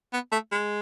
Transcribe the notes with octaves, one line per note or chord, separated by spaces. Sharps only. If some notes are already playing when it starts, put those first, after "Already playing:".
B3
A3
G#3